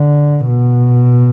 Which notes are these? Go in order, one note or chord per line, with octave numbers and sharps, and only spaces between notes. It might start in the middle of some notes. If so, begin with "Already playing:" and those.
Already playing: D3
B2